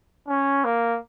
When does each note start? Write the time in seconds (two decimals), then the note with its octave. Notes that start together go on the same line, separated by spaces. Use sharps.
0.28 C#4
0.65 A#3